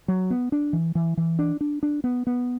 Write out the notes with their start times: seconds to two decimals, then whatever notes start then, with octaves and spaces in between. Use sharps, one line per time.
0.08 F#3
0.30 B3
0.52 D4
0.73 E3
0.95 E3
1.17 E3
1.39 D4
1.61 D4
1.83 D4
2.04 B3
2.27 B3